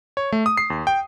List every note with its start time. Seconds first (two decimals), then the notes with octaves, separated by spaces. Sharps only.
0.17 C#5
0.32 A3
0.46 D#6
0.57 C7
0.70 D#2
0.87 G5